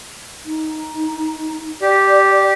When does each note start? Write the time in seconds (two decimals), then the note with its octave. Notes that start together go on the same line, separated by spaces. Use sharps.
0.45 D#4
1.82 G4 D5